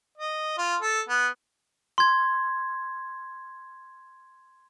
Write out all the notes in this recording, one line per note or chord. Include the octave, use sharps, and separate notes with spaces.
D#5
F4
A4
B3
C6 G#6